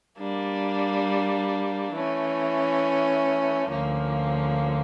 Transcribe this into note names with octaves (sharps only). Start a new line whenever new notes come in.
G3 A#3 D4
E3 A3 C#4
D2 D3 F3 A#3 C#4